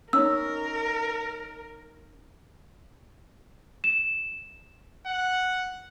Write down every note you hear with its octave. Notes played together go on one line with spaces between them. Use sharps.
C#4 D#4 A#4 E6
E7
F#5